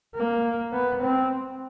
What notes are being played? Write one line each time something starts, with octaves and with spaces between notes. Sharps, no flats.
A#3
B3
C4